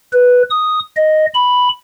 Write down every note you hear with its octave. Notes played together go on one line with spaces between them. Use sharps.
B4
D#6
D#5
B5